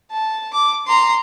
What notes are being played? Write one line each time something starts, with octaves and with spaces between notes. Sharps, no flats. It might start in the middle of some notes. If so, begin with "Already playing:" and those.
A5
D6
A#5 C6